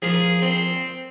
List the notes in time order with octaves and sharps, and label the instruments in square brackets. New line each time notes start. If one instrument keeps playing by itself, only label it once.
[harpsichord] F3 A#3 F4 [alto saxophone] G#4
[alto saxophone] C4